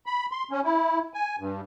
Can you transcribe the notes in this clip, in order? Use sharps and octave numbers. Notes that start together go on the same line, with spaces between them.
B5
C6
C#4
E4
G#5
G2